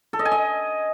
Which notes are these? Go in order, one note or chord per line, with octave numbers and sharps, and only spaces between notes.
A4
D#5
G#5
D#5